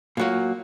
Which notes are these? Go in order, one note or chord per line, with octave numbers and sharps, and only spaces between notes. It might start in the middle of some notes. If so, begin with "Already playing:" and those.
A#2 F#3 A#3